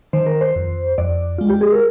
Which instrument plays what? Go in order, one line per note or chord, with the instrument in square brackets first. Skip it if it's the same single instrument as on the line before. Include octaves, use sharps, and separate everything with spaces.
[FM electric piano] D#3 C5
A#4
C5
F2
F2 D5
G#3 F4
G4
G#4
A#4